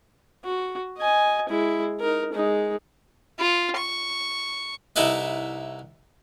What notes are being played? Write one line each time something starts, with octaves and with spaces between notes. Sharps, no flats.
F#4
D#5 G#5
G#3 E4
D#4 A#4
G#3 D#4
F4
C#6
C2 D#4 E4 A4 B4 D#5